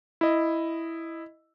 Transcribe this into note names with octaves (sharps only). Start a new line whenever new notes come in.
E4 D#5